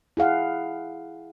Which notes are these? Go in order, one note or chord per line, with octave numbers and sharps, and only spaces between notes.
E4 G#4 F5 F#5